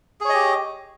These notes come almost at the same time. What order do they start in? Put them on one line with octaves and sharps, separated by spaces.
G#4 C#5 D#5 G4